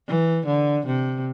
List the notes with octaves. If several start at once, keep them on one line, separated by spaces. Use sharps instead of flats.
E3
D3
C3